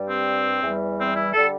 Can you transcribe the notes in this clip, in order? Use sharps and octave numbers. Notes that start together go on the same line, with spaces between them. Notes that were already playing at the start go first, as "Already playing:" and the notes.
Already playing: G2 G3
C4
E2 E3 G3
C4
E4
D3 G3 A4